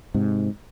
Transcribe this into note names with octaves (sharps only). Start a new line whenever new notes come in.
G#2 C3